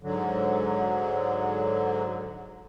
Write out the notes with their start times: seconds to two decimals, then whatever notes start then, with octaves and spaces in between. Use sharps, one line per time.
0.03 G#2 D3 F#3